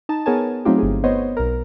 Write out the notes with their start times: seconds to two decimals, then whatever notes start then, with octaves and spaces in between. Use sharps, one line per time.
0.09 D#4 A5
0.26 B3 G#4 A#4 C#5 G#5 A5
0.65 F#3 A3 C4 D#4 F4 G4
0.78 G1 G#4
1.04 B3 C5 C#5 D#5
1.37 B1 A#4